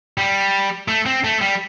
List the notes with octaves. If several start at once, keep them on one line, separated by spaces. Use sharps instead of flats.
G3
A3
C4
A3
G3